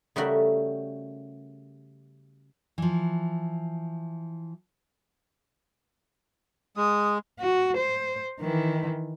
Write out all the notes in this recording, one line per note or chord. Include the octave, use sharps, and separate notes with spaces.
C#3 G3 A3 F#4 A#4 E5
E3 F3
G#3 D#6
F#4
C5
D#3 E3